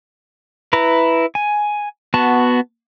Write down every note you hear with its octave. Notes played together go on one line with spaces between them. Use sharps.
E4 B4 A#5
G#5
B3 F#4 A5